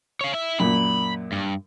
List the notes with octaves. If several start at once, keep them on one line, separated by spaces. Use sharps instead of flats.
C#5 F5
E4 E5
F#2 A#2 B5
G2